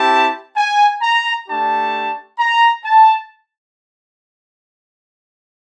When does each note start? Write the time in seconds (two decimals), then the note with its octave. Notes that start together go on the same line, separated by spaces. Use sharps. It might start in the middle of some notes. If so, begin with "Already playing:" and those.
Already playing: C4 E4 G4 A5
0.56 G#5
1.02 A#5
1.48 A3 D4 G4 A5
2.39 A#5
2.84 A5